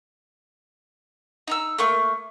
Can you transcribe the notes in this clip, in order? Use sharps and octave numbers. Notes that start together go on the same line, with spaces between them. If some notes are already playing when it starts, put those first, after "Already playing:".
D#4 A#5 E6
A3 A#3 C#6